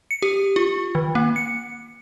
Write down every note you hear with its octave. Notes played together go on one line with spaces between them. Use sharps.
C#7
G4
F4
D#3
A#3
C#7